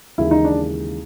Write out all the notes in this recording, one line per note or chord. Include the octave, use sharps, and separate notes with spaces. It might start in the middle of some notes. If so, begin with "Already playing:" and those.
D#2 C#3 E3 G#3 E4
D#4
D4